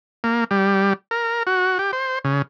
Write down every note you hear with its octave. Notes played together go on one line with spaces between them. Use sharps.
A#3
G3
A#4
F#4
G4
C5
C#3